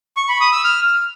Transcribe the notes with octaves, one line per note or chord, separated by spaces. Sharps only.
C#6
B5
D#6
E6
F6